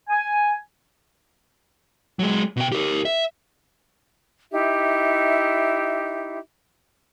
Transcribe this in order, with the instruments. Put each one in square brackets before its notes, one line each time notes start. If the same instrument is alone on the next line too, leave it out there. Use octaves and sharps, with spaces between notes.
[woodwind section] G#5
[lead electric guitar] F#3 G#3
B2 G5
G4 A#4
E5
[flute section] D#4 E4 G4 E5